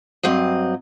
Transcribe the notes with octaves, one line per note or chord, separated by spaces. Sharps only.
G2 F#3 C4 D#5